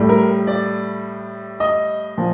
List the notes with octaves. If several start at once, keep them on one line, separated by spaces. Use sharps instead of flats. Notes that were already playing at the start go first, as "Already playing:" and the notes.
Already playing: A2 G3
A#4
D5
D#5
A#2 F3